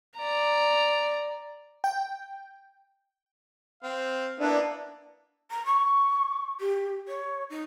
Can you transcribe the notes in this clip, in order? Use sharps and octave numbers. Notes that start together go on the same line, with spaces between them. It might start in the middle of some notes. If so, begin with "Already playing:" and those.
D5 A#5
G5
C4 F5
A#3 B3 D4 E4
A#5
C#6
G4
C#5
D#4